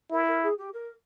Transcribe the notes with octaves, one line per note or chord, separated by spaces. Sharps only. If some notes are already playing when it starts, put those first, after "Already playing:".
E4 A#4
A#4
G#4
G4
A#4